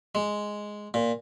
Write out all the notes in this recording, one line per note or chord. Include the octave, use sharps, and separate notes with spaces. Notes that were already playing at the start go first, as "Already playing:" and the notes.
G#3
A#2